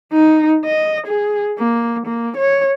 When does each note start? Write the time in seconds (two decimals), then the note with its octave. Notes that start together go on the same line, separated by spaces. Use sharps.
0.13 D#4
0.66 D#5
1.07 G#4
1.58 A#3
2.06 A#3
2.37 C#5